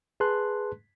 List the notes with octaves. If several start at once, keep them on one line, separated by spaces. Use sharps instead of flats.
G#4 B4 A5 C6 F#6